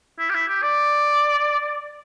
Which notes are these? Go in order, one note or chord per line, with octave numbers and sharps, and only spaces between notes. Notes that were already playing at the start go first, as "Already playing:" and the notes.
E4
G4
E4
G4
D5